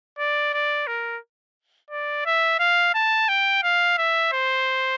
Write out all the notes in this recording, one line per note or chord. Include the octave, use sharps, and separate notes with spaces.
D5
D5
A#4
D5
E5
F5
A5
G5
F5
E5
C5